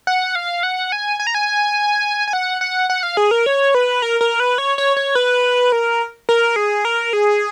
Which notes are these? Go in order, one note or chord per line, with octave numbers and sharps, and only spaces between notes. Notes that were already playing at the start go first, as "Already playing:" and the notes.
F#5
F5
F#5
G#5
G#5
A#5
G#5
G#5
F#5
F#5
F#5
F5
G#4
A#4
C#5
B4
A#4
A#4
B4
C#5
C#5
C#5
B4
A#4
A#4
G#4
A#4
G#4